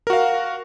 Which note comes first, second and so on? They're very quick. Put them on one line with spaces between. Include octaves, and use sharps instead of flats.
A#4 F#4 F5